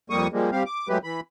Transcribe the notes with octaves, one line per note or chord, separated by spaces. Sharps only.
F2 G3 A#3 C#6 D#6
F3 G3 G#3 A#3
G3 C4 G4 F5
D6
F#3 G#3 A3 G4 B4
E3 B5